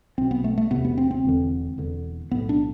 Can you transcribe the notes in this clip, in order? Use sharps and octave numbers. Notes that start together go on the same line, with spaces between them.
B1 B2 C4
B3
A3
A3
E1 D2 C3 B3
B3
C4
C4
E1 E2 D3
E1 E2 D3
B1 A2 B3
D4